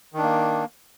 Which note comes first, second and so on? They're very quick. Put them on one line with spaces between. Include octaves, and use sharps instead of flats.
D#3 D4 A#3